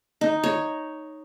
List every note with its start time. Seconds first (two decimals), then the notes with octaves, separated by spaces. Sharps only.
0.21 D#4
0.44 C#5